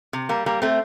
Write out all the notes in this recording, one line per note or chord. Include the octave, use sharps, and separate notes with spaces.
C3
G3 A#3
G3 A#3
A3 C4